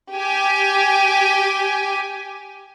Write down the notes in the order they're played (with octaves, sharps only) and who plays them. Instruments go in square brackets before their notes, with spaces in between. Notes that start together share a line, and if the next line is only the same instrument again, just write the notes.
[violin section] G4 G#5